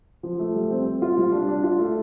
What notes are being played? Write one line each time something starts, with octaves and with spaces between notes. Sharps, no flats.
F3
A3
G3
C4
C4
F4
G3
D4
D4
F4
A3